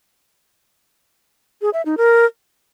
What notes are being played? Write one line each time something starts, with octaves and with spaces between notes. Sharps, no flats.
G#4
E5
D#4
A#4